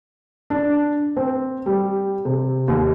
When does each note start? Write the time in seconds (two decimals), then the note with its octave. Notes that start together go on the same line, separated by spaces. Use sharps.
0.50 D4
1.16 C4
1.66 G3
2.25 C3
2.68 D#2